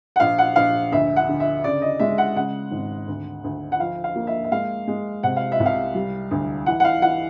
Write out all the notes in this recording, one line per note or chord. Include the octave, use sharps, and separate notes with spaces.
F#5
A#1 F5
F#5
A#1 F5
D2 E5
F#5
D3
E5
C#3 D5
D#5
G#3 E5
F#5
C#3 F#5
G#1
D2
D2
F#5
F3 F5
F5
A#3
E5
E5
G#3 F5
G#3
C3 F#5
F5
E5
C2
F5
G3
D2
E3 F#5
F#5
F5
E3 F#5